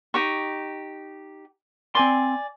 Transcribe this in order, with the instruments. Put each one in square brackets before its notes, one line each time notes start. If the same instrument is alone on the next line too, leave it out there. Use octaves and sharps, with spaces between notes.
[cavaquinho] D#4 G4 C#6
[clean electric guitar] C4 C6 [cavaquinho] D5 G#5